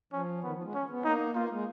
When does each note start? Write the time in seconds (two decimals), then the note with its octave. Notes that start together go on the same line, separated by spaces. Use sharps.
0.12 F3 C#4
0.43 D#3 B3
0.54 F3
0.64 G#3
0.74 C#4
0.90 B3
1.04 A#3 D#4
1.35 A#3 F4
1.51 G#3